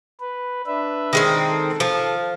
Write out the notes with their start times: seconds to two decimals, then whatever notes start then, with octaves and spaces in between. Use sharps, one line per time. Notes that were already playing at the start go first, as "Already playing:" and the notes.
0.20 B4
0.67 D4 B4 E5
1.13 D#3 G#3 C4
1.49 A4
1.80 F3